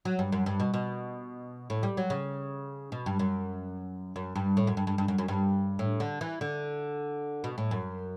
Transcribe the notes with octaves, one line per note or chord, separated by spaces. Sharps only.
F#3
G2
F#2
G2
B2
B2
A2
G3
F#3
C#3
B2
G2
F#2
F#2
G2
A2
F#2
G2
G2
G2
F#2
F#2
G2
A2
D3
E3
D3
B2
A2
F#2